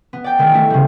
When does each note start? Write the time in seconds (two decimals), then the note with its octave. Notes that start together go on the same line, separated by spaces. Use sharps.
0.13 B3
0.24 D5 G5
0.39 D#3 G#3 E4
0.52 A3 E4
0.70 C#3 G3